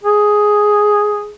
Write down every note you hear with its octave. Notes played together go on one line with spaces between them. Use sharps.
G#4